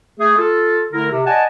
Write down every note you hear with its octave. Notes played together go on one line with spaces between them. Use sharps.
A3 G#4
F4 A4
D3 A3 E4 A#4
C3
D5 D#5 F#5 G#5 A5